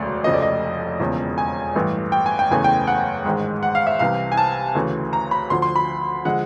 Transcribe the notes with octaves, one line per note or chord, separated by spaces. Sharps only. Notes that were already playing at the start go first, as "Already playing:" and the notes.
Already playing: E1 D2 C#3 F#3 A3 D5
F1 F2 C#3 F3 A3 D#5
D5
D#5
E1 E2 C#3 F3
G#5
A1 G2 E3 A3
G5
G#5
G5
F#1 E2 C#3 E3 A3 G#5
G5
F#5
A1 G#2 D#3 G#3
F#5
F5
E5
C2 C3 E3 F5
G#5
A5
D2 C#3 E3 A3
A#5
B5
D2 D3 F3 C6
C6
B5
D3 F3 G#3 F#5